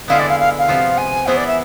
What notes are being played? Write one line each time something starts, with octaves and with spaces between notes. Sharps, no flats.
D3 G#3 B3 E4 G#4 F5
D5
F5
F5
F5
C3 F3 B3 F4
G#5
E3 B3 E4 G#4 C5
D5
E5